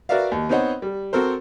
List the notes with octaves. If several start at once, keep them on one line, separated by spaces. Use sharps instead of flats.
F#4 A#4 B4 D5 E5 F5
D#2
B3 C4 D#4 C5 C#5 F#5
G3
C4 F#4 A4 A#4 C5